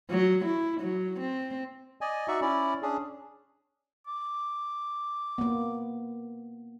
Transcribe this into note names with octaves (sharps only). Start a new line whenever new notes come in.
F#3
E4
F#3
C4
D5 D#5 G#5
D#4 F#4 D5 E5 C#6
C#4 E4 D5
C#4 D4 G#4
D6
A#3 B3